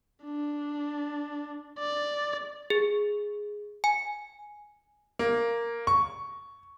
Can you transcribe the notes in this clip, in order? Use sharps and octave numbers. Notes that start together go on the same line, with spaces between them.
D4
D5
G#4
G#5
A#3
C#6